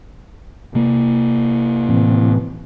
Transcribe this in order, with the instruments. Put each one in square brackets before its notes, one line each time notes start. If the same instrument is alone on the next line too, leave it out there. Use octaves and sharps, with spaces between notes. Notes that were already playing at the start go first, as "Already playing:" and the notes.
[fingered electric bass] C3 A#3
[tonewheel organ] A2 E3 C4